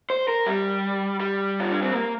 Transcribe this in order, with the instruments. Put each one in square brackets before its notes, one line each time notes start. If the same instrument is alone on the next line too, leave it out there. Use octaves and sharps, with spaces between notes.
[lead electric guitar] C5
A#4
G3
G3
F4
D4
C4
A#3